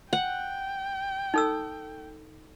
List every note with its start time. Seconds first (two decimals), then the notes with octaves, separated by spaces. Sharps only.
0.13 F#5 G5
1.34 D#4 A4 E6